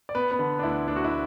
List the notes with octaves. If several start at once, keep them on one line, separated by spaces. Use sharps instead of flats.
D5
B3 B4
B3 B4
D3
D4
D2 E4
D2 D4
F#4
E4